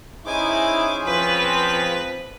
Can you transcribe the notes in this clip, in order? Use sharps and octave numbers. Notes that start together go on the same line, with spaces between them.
C#4 D#4 E4 G#4 C5 G#5 D6
F3 C4 B4